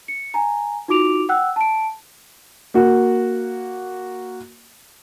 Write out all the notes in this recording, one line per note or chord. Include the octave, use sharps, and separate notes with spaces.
C#7
G#5 A#5
D#4 F4 F#4 D6 D7 F7
F#5 G5 E6 F#6
A5 D7
A#3 F#4